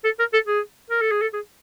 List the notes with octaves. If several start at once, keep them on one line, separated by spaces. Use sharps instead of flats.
A4
A#4
A4
G#4
A#4
A4
G#4
A4
G#4